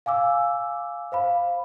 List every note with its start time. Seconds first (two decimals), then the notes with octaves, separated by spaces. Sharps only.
0.06 F5 G#5 D6 E6
1.12 C5 F5 B5